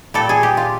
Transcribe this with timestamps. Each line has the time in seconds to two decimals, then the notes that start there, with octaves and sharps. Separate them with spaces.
0.14 A#2 G3 A4
0.29 G#4
0.43 G4
0.57 F4